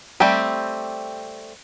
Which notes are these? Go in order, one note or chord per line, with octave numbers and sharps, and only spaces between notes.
G3 A3 C4 G4